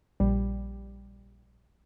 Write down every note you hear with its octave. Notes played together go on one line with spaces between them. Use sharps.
A#1 G3